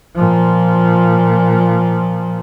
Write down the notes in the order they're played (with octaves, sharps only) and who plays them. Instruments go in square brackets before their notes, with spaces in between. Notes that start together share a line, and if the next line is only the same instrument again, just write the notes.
[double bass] A#2 F3